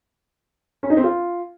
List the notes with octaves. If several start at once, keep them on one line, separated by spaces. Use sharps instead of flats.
C#4
D#4
C4
F4